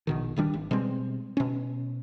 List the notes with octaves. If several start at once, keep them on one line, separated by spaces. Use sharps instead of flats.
A#1 B2 D#3
D#1 D#3 G3 D4
G#1
B2 G3 G#3 C4
B2 C#4